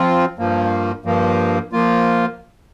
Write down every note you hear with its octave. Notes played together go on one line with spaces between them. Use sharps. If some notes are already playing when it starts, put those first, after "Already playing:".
Already playing: F3 C4 F4
G2 F3 A#3
G2 F3 A#3
F3 A#3 F4